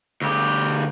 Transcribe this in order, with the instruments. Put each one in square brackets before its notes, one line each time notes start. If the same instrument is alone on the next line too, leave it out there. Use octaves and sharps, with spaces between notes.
[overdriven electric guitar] D2 G4